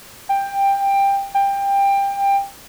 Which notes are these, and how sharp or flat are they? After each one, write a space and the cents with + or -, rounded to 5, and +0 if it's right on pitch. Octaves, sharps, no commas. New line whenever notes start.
G5 +15
G5 +20